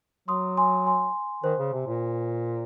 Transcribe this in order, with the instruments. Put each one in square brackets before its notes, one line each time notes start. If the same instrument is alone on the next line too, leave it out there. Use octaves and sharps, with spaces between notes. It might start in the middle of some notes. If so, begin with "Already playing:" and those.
[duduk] F#3 [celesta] C6 D#6
[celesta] G#5 C6
G#5 C6
[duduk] D#3 [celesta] C5
[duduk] C#3
C3
A#2